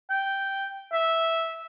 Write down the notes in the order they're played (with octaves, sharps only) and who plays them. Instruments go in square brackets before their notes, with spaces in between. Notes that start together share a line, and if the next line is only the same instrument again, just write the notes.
[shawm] G5
E5